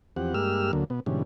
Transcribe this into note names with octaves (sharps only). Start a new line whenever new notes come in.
E2 F3 C4 G4 F#5
G2 G#3 A#3 G4 E6 F6
D2 D3 F#3 A#3
B2 B3
G#2 B2 D3 E3 G3 C#4